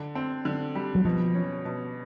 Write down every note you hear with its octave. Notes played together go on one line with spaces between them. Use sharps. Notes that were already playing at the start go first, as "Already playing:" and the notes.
Already playing: D3
C4
D3
G3
F#3
B2 F3
C#4
B2